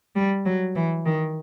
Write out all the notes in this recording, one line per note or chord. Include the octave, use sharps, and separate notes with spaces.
G3
F#3
E3
D#3